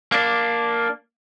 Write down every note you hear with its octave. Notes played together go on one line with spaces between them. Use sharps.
A#3 D4